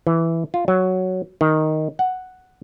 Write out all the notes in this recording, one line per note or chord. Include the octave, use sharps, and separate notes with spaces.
E3
F4
F#3
D#3
F#5